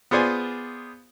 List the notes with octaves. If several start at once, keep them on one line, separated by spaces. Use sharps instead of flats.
B3 F4 G#4 C5 D5 G#5